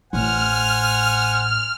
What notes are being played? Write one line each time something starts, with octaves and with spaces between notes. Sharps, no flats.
A1 A2 C5 F#5 G#5 F6